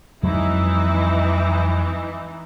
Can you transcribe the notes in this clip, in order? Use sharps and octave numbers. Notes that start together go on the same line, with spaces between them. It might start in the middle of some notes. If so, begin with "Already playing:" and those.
F2 E3 F#3 G#3 D#4 E4